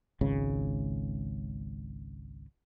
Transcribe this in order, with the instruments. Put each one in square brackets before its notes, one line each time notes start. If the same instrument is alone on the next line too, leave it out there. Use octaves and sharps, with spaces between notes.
[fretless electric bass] G#1 C#2 C#3